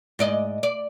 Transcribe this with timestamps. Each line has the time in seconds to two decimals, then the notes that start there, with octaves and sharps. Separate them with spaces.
0.19 G#2 D5 D#5
0.63 D5